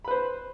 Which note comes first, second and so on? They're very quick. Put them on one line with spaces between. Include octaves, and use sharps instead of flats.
B5 B4 C5